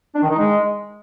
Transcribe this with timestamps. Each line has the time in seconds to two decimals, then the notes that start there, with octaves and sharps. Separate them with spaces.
0.15 D4
0.23 D#3
0.31 D#4
0.38 G#3